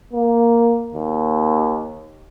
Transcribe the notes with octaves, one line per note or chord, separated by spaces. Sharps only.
A#3
D#2